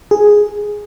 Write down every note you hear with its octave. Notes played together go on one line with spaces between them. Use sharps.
G#4